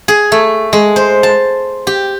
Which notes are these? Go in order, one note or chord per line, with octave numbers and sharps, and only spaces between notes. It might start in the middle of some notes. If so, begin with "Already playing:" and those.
G#4
A3
G#3
C5
A5
G4